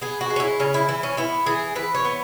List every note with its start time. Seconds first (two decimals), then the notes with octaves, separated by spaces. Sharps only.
0.01 B3 G#4
0.21 F#4
0.30 G#3
0.36 C#4
0.40 E4
0.59 C#3 C#4
0.74 E4
0.88 E3 E4
1.03 C#4
1.17 B3 E4
1.46 E3 G#4
1.75 E3 B4
1.94 C#5
2.04 B3